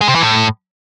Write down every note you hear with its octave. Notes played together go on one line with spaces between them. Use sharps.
G#3
C3
E3
A2